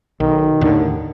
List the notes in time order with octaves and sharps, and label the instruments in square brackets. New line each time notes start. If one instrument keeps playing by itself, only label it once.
[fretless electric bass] B1 [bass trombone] D#3
[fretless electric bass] D#2 A2 D3